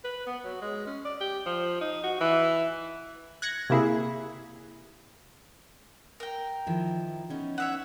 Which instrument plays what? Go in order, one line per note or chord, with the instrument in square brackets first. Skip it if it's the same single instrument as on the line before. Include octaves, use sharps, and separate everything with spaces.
[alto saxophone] B4
B3
F#3
G#3
C#4
D5
G4
F3
D#4
F#4
E3
[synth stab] F#6 G#6 A#6 C#7
C3 A#3 E4 G#4
[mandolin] A#4 G5
[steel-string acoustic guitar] D#3 F3 E4
B3 C#4 D#4
[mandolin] C#5 E5 F#5